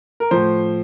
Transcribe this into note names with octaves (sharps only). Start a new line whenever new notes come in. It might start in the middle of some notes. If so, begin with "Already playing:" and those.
A#4
A2 F3 C5